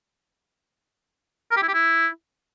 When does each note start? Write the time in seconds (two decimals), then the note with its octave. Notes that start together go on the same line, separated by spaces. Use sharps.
1.51 A#4
1.57 G4
1.63 E4
1.68 G4
1.74 E4